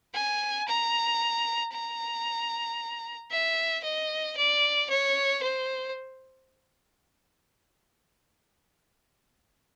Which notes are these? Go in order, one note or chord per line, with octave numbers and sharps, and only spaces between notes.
G#5
A#5
A#5
E5
D#5
D5
C#5
C5